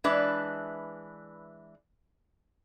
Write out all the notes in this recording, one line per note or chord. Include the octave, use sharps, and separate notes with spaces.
E3 G#3 D4 B4 E5